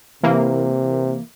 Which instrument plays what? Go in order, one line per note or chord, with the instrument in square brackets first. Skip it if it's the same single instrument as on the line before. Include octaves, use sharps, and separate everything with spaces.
[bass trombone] C3 [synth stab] E3 A#3